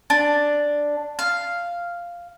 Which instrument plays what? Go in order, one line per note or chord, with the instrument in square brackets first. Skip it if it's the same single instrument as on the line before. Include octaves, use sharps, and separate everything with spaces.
[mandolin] D4
F5